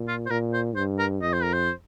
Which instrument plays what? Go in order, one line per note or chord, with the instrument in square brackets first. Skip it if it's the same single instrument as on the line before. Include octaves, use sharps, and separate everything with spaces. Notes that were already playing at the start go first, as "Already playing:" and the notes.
Already playing: [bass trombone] A#2
[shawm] F4
C5
[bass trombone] A#2 [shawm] A#4
[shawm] C5
[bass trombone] G2 [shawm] C5
[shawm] A#4
[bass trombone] F2 [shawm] D#5
[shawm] C5
A#4
C5